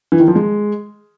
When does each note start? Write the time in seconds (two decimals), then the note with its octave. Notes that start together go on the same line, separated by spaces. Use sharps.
0.12 E3
0.20 D#3
0.28 F3
0.35 G#3